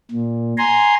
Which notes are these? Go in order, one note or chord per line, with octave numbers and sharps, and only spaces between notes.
A#2
G#5 A#5 C6